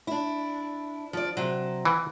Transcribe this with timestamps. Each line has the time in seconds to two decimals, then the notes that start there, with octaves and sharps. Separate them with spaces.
0.07 D4 E4
1.13 F3 D5
1.37 C3 F#3
1.85 E3